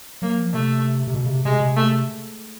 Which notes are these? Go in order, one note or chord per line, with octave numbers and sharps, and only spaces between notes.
F#3 A#3
F3
C3 A3
C3
B2
C#3
C3
C3 G#3
C3
A3